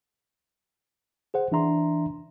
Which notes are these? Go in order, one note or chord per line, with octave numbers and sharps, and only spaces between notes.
G#4 C5 F#5
E3 D4 E5 A#5 C6